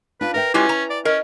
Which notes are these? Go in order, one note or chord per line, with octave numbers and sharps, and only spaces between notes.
D4 F4 B4
A#4 B4 E5 G5
G#3 C#4 E4 F4 G4 G#5 D6
A#5
D5
C#4 A#4 D#5